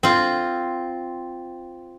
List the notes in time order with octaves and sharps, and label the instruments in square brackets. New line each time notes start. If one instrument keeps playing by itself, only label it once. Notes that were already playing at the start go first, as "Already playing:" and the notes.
[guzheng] C4 F4